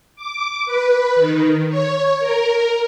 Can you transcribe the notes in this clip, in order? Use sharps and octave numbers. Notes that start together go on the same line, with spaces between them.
D6
B4
D#3
C#5
A#4